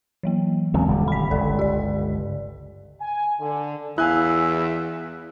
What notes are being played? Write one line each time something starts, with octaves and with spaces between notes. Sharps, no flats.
E3 F#3 A#3
E2 C#3 G#3 C4
D#1 D3 G3
B5 B6
G1 C#2 A4 D5
G4 D5
G#5
D3
E2 E4 E5 F5 G#5 F#6